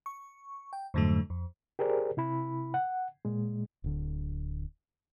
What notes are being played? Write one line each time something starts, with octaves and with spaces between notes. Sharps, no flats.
C#6
G5
F2 G#2 D3 F#3 A3
F2
G4 G#4 A#4 C5 D5
C3 E4 B5
F#5
A#2 G#3
D1 D3